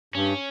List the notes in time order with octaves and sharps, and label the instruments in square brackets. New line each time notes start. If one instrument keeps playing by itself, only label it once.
[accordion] G2 [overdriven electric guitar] C#4